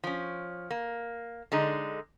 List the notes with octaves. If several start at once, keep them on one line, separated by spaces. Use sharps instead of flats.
F3 C#4
A#3
D3 G#3 D#4